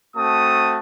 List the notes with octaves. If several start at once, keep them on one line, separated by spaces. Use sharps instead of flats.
A3 C4 F#4 A5 D#6